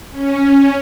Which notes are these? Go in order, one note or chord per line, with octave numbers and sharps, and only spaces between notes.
C#4